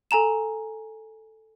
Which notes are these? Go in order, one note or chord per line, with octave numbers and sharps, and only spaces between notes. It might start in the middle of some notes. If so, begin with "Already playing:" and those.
A4 G#5 A#5 E7